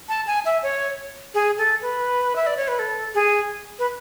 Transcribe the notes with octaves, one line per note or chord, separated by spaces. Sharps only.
A5
G#5
E5
C#5
G#4
A4
B4
E5
D5
C#5
B4
A4
G#4
B4